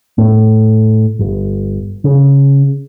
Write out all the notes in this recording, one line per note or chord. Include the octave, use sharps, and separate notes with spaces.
A2
G1
C#3